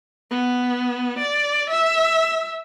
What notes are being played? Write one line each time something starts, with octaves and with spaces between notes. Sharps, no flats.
B3
D5
E5